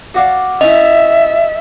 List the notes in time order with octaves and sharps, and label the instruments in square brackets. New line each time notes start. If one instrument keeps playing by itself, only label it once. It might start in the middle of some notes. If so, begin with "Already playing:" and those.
[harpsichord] F#4 D5 F5
[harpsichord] C#4 E4 [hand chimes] D#5 [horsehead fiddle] E5